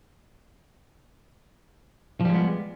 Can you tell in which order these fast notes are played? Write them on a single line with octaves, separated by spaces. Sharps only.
F3 G3 G#3 B3